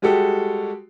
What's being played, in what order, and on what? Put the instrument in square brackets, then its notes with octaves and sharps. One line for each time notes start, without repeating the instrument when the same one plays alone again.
[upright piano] G3 G#3 F#4 G4 A4